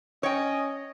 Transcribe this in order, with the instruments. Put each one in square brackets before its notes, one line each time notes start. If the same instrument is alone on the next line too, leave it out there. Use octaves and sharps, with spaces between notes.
[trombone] C#4 [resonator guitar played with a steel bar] C#5 G5 [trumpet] D#5